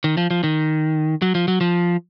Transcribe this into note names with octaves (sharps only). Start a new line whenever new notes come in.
D#3
F3
F3
D#3
F#3
F3
F#3
F3